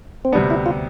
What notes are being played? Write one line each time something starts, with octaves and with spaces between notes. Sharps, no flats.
C4
D2 C3 G3 B3 D4
E4
F4